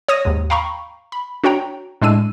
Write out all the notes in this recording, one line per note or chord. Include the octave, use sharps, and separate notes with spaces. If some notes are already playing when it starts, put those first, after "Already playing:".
C#5 D#6 A#6 D#7
D#2 G#2
F5 G5 A#5 B5 C#6
B5
D4 F#4 C#5 G5 A#5
A2 G#3 D4 E6 D#7